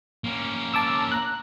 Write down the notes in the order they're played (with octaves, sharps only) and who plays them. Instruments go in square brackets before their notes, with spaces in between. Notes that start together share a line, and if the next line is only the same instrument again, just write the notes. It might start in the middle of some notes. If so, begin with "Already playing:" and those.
[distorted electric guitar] A#3 C#4
[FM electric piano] A5 D6 E6
A#5 F#6